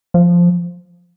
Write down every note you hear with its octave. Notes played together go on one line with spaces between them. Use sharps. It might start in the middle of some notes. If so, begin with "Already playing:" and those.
F3